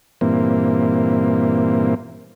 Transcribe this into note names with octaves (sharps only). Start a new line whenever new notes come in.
G2 A#2 E3 A#3 C4